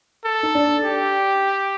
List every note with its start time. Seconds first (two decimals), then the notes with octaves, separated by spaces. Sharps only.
0.25 A4
0.43 D#4
0.55 D4
0.84 G4